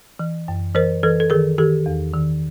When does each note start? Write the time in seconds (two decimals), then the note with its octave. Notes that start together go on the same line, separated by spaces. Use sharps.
0.19 E3
0.48 F#2
0.75 E3 A#4 C5
1.03 E3 A4 B4
1.20 A4
1.30 D#3 G#4 A#4
1.58 D#3 G4 A4
1.86 E2
2.13 D#3